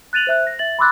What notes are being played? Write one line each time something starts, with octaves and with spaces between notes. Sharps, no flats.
F#6 A6 D#7 F7 F#7
C5 E5 F#6
A#6
E5 A6 F#7
B5 C6 D6 E6 F#6 A6